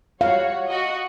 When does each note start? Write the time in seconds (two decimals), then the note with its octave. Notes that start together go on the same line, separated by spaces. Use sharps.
0.21 G3 F#4 C#5 F5
0.67 F#4 D#5